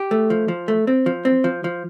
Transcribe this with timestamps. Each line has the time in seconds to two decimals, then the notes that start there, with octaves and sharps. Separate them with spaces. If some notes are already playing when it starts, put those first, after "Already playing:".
Already playing: G4
0.11 A3
0.30 F3
0.48 F3
0.68 A3
0.87 C4
1.06 F3
1.25 C4
1.44 F3
1.64 F3